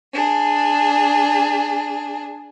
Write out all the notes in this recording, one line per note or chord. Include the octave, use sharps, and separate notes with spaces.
D4 G#4